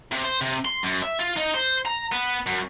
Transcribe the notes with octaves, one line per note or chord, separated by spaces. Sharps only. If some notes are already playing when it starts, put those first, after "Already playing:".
C3
C5
C3
C6
F#2
E5
F4
D#4
C5
A#5
B3
F#2